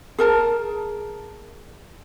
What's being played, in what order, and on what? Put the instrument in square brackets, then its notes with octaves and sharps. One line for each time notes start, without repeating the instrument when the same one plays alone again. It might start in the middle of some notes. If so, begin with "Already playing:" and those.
[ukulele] G#4 A#4 A5